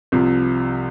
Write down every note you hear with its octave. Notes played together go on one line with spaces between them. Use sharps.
C2 C3 F3